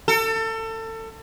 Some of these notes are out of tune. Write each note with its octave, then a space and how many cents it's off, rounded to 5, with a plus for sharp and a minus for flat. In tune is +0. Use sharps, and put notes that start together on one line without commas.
A4 +30